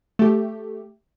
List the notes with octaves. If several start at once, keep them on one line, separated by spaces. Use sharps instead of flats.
A3 G4